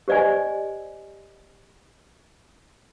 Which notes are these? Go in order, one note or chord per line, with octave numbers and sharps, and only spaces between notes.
G4 C5 D5 D#5 G#5